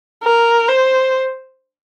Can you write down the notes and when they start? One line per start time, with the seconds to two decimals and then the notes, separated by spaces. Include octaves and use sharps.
0.23 A#4
0.68 C5